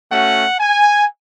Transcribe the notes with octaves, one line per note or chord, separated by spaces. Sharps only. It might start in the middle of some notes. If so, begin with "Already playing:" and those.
A3 C#4 F#4 F#5
G#5